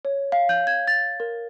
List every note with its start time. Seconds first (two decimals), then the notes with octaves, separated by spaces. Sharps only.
0.05 C#5
0.32 F5
0.49 G6
0.67 G#6
0.88 A6
1.20 A#4